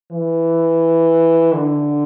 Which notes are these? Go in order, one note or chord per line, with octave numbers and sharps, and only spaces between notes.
E3
D3